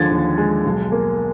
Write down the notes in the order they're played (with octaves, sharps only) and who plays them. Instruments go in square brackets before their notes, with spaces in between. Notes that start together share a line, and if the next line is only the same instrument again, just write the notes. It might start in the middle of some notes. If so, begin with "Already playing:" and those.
Already playing: [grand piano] D#2 D3 F3 G#3 G#6 A6
D#2
G#3
B1
A#3